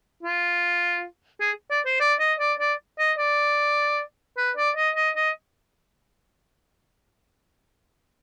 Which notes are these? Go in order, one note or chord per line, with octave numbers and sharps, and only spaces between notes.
F4
G#4
D5
C5
D5
D#5
D5
D5
D#5
D5
B4
D5
D#5
D#5
D#5